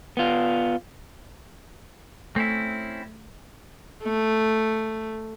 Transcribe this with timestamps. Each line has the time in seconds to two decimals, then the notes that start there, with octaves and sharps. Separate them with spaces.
0.17 B3 F4
2.36 A3 C4 C#4 E4
4.03 A3